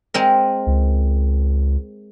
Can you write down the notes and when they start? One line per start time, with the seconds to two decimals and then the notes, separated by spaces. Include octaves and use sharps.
0.14 G#3 C4 A#4
0.67 C#2